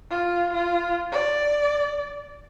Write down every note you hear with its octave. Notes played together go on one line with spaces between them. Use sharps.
F4
F4
D5